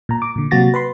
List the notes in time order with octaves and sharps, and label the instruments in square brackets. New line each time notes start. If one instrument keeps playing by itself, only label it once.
[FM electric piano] A#2 A#5
D6
A#2 D3
C3 F#3 A#3 F#4 A6 A#6
B4 B5 C6